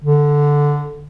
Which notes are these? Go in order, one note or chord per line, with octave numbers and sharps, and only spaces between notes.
D3